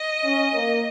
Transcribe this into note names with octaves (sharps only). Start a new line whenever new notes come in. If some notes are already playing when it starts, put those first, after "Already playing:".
Already playing: D#5
C#4
A#3